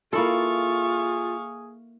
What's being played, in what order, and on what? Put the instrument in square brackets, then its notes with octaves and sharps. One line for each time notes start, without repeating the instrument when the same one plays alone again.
[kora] A#3 E4 A4 [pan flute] F4 [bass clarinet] G#4 [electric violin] F5 C#6